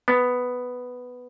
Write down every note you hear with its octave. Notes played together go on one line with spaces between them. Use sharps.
B3